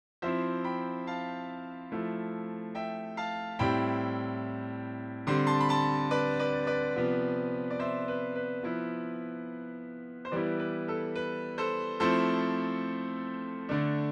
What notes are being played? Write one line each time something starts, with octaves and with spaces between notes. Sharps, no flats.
F3 C4 E4 C5 E5
G5 B5
F5 A5
F3 A3 E4
E5 G5
F5 A5
A2 G3 C4 E4 G5 B5
D3 G3 C4 C6
A5 C6
B5
A5 C6
B4 D5
B4 D5
B4 D5
C3 F3 B3
D5
C5 E5
B4
B4
F3 B3 E4
C5
E3 G3 B3 E4 B4 D5
B4
A4
B4
A4 C5
F3 A3 C4 E4 A4 C5
D3 A3 D4